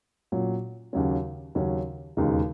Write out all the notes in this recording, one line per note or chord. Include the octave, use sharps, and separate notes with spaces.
A#2 F#3 C#4
D#2 C#3 F#3 C#4
D#2 C#3 F#3 C#4
E1 D#2 C#3 G#3 D#4